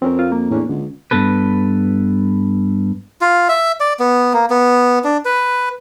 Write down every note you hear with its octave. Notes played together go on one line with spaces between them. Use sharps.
F2 C4 C#4 A#4
F4
A#3
E2 A2 C#4 D4
C#2 D3
G2 C3 B3 A4 B4
F4
E5
D5
B3
A#3
B3
D4
B4